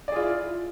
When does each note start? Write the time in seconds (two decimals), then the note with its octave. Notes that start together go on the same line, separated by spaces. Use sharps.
0.08 D5
0.12 G#4
0.16 F4
0.20 E4